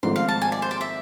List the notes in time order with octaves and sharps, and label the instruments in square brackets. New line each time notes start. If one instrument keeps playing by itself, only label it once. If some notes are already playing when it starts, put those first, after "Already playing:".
[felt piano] G#1 G#2 F3 A3 [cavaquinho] C6
[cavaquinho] F5
A5
G#5
D5
C5
D5
E5